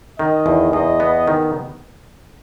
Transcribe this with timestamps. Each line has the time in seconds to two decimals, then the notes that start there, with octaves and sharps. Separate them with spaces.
0.19 D#3 D#5
0.46 E2
0.73 E2 D#5
1.00 B3
1.27 D#3